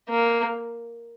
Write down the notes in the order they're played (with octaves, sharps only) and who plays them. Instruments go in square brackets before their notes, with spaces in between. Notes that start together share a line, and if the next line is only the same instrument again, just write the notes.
[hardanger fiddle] A#3